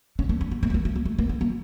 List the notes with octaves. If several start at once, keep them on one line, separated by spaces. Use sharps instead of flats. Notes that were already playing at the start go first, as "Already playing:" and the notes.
C#4
A#3
C#4
A#3
A#3
A3
A#3
A3
A#3
A3
A#3
C#4
A#3